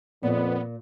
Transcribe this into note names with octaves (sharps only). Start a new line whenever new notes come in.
F2 A#2 B3